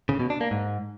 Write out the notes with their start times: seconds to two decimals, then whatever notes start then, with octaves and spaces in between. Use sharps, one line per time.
0.09 C#3
0.20 B2
0.30 D4
0.41 A#3
0.51 G#2